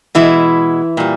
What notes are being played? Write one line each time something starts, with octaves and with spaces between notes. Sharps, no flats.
B2 E3 G#3 E4
A#2 G3